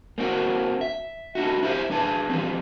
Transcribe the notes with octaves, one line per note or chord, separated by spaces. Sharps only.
A#3 C4 D4 F#4
E5
D4 D#4 F#4
E4 F4 G4 C5 E5
D4 G#4 B4 A5
E3 F3 G3 A3 C4